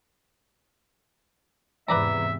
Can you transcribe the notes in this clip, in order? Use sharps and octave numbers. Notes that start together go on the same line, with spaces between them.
E2 G#2 C3 B4 D5 E5 A#5